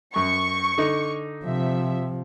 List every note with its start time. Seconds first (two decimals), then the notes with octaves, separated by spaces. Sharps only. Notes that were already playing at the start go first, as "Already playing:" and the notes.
0.16 F#2 C#6
0.78 D3 D#4
1.45 C3 F3 E5